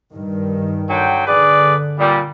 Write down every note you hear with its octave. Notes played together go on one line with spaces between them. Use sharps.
G2 D#3
D3 F#3 G5
D3 G#4 B4 D5
A#2 G3